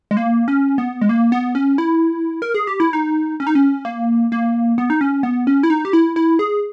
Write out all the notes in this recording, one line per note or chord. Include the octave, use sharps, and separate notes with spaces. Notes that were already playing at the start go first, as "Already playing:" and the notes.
G#3
A#3
C#4
B3
G#3
A#3
B3
C#4
E4
A#4
G#4
G4
E4
D#4
C#4
D#4
C#4
A#3
A#3
B3
D#4
C#4
B3
C#4
E4
D#4
G4
E4
E4
G#4